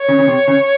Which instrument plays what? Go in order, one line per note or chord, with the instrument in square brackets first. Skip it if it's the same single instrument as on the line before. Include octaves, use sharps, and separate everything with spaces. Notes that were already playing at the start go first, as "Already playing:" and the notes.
Already playing: [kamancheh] C#5
[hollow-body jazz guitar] C#3
C#3
C3
C#3